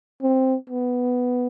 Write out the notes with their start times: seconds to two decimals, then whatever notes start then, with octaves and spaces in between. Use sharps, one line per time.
0.22 C4
0.70 B3